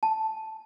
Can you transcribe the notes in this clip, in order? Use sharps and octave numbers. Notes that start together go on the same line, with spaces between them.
A5